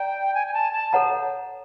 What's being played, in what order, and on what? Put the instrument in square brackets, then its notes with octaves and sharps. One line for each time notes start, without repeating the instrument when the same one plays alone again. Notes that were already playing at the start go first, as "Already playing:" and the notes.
Already playing: [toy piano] D5 A#5 [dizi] G5
[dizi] G#5
G#5
A5
A5
[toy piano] A4 C#5 F#5 A#5